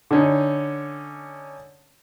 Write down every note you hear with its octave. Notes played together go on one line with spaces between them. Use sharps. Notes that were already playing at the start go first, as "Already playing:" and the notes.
D3 C#4 D#4